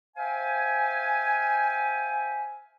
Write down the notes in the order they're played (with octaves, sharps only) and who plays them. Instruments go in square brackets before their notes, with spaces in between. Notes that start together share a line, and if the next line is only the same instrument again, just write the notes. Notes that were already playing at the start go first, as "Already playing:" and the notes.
[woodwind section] C5 E5 F5 G5 G#5